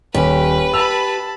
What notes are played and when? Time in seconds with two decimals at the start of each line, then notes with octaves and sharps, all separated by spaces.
0.14 D#1 C#4 G4 B4
0.74 A5 B5 E6 F7